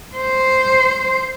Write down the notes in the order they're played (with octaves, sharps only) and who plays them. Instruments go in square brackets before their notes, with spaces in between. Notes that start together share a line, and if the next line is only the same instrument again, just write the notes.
[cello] C5